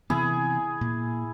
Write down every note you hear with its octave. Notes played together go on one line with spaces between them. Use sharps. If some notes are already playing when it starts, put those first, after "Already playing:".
C3 E3 B3 E4 G#4
A#2